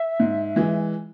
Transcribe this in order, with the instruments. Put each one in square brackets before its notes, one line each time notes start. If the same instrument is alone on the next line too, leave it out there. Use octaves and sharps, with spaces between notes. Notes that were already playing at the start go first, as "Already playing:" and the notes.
Already playing: [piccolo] E5
[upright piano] G#2
E3 G#3